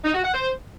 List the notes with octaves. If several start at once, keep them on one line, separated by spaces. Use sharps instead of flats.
D#4
F#4
F#5
C5